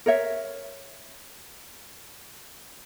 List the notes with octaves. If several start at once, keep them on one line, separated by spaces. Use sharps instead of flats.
A#4 C#5 E5